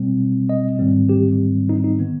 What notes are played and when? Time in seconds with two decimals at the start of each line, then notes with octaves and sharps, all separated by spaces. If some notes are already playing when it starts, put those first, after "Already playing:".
Already playing: B2 G3 C4
0.49 D#5
0.79 G#2 D#3 G3 C4
1.09 G4
1.69 D#4
1.84 D#4
1.99 D#3 B3